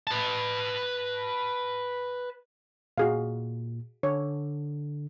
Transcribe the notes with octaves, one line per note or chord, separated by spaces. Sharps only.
B4 A5
A#2 F#4 G#4 F5
D3 C#5